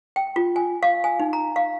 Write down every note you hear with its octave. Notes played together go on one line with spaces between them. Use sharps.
G5
F4
G#5
F5
G#5
D#4
A#5
F5